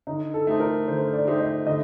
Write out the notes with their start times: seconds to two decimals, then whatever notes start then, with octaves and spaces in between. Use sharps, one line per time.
0.07 D3 D#4
0.34 A4
0.47 A3 D#4 G4 C5
0.60 A#4
0.88 D3 C5
1.13 D5
1.27 A3 D#4 G4 C5
1.40 D#5
1.66 D3 D#5